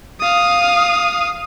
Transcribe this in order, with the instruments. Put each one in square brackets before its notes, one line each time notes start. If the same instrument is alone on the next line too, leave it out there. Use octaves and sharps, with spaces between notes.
[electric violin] F5 D#6